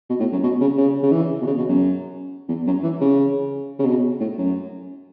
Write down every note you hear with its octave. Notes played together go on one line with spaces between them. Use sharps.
B2
A2
F#2
B2
C#3
C#3
C#3
E3
B2
C#3
B2
F#2
E2
F#2
E3
C#3
C#3
B2
A2
F#2